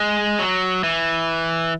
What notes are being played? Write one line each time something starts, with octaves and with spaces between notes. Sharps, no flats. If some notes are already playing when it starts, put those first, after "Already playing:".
Already playing: G#3
F#3
E3